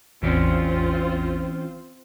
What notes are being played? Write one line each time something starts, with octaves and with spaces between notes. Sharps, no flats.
A1 E2 E3 C4 C#4 F4 C5 D5